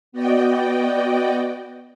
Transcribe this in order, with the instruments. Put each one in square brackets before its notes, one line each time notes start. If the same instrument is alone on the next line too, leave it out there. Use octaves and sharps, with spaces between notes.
[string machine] B3 F#4 D5 D#5 G5